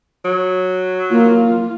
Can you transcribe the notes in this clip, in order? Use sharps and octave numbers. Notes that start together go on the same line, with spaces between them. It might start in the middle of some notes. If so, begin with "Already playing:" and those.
F#3
A#3 F4